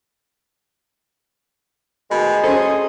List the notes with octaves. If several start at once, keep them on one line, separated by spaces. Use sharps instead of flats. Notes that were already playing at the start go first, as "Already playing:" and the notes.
B2 D#3 G#3 A3
F#3 C#4 G#4 A4 C5